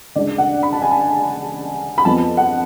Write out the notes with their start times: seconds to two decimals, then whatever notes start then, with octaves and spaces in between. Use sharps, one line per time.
0.16 D2 C#3 G#3 D4 D5
0.38 F#5
0.63 B5
0.73 A5
0.82 G#5
0.91 A5
1.98 B5
2.05 F2 F3 B3 A5
2.37 F#5